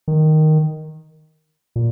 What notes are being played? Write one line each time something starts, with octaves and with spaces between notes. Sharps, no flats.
D#3
A#2